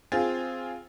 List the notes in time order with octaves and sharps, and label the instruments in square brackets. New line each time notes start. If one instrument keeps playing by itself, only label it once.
[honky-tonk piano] C4 F4 G#4 A6